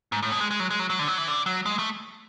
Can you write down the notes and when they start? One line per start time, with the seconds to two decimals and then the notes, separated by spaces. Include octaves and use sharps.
0.12 G#2
0.22 A2
0.32 B2
0.40 G#3
0.51 G#3
0.60 F#3
0.70 G#3
0.79 F#3
0.90 F#3
0.99 D3
1.08 F#3
1.18 E3
1.28 D3
1.46 F#3
1.66 G#3
1.79 A3